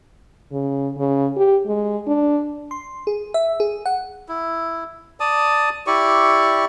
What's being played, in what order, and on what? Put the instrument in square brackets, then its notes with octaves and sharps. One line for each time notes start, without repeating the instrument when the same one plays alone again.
[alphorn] C#3
C#3
G4
G#3
D4
[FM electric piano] C6
G#4
E5
G#4
F#5
[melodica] E4
D5 A5 D#6
E4 G4 D5 C#6